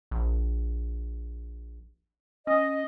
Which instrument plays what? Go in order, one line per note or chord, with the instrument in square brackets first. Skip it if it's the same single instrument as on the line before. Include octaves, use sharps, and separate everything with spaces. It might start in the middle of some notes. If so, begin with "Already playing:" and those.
[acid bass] A#1
[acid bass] C#4 [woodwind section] D#5